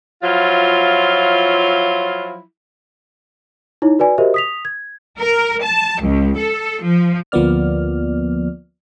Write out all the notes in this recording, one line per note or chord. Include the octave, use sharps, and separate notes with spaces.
F3 F#3 E4 F4
D#4 E4 C#5
F#4 B4 D5 G#5
F#4 G4 A#4 C5 D#5 E5
D#6 B6 F7
G#6
A#4
A5
C#2
A4
F3
D2 F3 A#3 B3 D5 F6